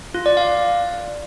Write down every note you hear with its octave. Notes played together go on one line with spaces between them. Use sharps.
F4
D5
F5